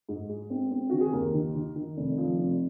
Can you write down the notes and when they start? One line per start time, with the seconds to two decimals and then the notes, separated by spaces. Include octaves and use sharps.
0.09 G#2
0.29 G#3
0.50 C4
0.71 C4
0.90 D#3 F#4
1.01 G#4
1.13 D#2 A#4
1.34 D#3
1.55 D#3
1.76 D#3
1.97 F1
2.18 F3
2.38 F1